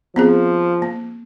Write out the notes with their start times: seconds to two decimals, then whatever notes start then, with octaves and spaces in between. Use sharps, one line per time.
0.16 F3 B3 C4 G#4
0.82 A#3